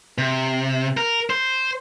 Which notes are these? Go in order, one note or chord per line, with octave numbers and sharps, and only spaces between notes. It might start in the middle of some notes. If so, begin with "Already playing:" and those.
C3
A#4
C5